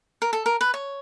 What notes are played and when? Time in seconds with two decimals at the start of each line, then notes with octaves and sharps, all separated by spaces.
0.22 A#4
0.33 A4
0.46 A#4
0.61 B4
0.74 C#5